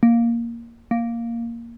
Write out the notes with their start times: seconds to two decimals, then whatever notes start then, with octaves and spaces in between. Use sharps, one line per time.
0.03 A#3
0.91 A#3